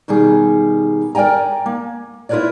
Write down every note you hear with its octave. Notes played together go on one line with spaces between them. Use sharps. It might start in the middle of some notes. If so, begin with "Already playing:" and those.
B2 D#3 G3 G#4
A#4 D5 G5 G#5 A#5
A#3
E4 F4 A#4 B4 C#5 D5